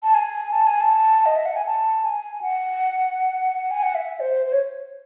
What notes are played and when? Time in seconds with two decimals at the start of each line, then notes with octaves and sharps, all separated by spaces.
0.03 A5
0.15 G#5
0.52 A5
0.67 G#5
0.81 A5
1.26 D#5
1.36 E5
1.46 F#5
1.56 G#5
1.66 A5
2.05 G#5
2.42 F#5
3.71 G#5
3.83 F#5
3.95 E5
4.20 C5
4.46 C5
4.53 C#5